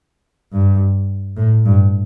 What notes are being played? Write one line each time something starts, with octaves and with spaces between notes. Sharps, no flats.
G2
A2
G2